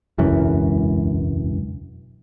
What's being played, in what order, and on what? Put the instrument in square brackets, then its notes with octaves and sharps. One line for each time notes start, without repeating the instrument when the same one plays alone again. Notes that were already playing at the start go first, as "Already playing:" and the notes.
[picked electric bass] E1 C#2 F#2 E3